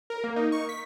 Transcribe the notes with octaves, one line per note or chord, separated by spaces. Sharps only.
A#4
A#3
D#4
C#6
B6